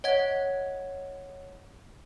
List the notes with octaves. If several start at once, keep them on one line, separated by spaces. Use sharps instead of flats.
C#5 D#5 F#5 G#6